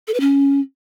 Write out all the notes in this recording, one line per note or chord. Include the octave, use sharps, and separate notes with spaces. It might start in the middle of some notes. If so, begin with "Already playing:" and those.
A4
B4
C#4